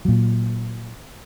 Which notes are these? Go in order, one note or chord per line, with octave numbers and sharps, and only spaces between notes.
A#2 F#3